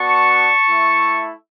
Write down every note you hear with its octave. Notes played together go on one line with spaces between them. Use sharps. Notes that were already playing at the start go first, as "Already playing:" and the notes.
Already playing: B3 D4 F#4 A5 C#6
A3 E4